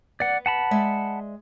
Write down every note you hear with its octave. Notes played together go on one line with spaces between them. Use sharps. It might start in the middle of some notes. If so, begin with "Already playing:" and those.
B3 D5 F#5
F#5 A5 B5
G#3 D5 E5